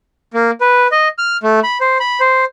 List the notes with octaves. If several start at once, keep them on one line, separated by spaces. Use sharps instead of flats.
A#3
B4
D#5
F6
A3
B5
C5
B5
C5